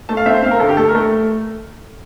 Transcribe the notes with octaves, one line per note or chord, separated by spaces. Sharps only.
A3 A5
F5
C4 E5
C5
C4 F5
A#4
D2 A4
G4
A3 A4
A#4
A3